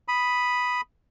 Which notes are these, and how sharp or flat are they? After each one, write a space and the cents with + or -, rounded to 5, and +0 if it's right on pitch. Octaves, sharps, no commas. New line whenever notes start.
B5 +0 D#6 +0